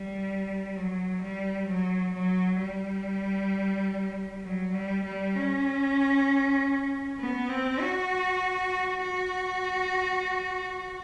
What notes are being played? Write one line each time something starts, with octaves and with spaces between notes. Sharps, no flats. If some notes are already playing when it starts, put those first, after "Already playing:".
Already playing: G3
F#3
G3
F#3
F#3
G3
F#3
G3
G3
C#4
B3
C4
F#4
F#4